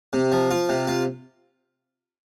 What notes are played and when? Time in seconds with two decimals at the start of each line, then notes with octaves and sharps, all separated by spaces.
0.13 C3
0.32 F3
0.51 F4
0.69 C3
0.87 F4